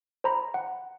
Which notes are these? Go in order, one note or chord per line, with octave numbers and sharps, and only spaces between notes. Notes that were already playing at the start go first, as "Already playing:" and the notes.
C5 A#5 B5
F#5